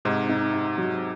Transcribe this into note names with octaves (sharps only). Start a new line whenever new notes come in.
G#2 C3 D#4
D#4
D#4
F#3